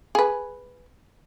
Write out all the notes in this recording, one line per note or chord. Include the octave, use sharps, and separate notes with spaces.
G#4 B4